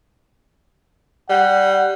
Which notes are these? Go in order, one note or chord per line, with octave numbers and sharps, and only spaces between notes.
G3 F#5